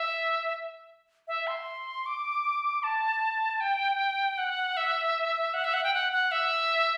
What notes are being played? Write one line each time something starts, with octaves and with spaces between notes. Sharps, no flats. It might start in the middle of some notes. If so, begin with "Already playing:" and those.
Already playing: E5
E5
C6
D6
A5
G5
F#5
E5
F#5
E5
F#5
G5
F#5
F#5
E5